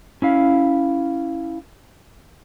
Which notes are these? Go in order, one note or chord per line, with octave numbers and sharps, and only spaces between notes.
C#4 E4 F5